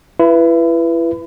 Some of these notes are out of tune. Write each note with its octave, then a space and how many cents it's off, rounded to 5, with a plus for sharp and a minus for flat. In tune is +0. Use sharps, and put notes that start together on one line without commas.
E4 +30 B4 +0